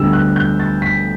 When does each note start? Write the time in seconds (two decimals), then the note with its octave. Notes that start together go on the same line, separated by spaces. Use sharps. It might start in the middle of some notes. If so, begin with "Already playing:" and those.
Already playing: D2 D3 G3 B3 D4 E6
0.13 F#6
0.36 G6
0.60 A6
0.82 B6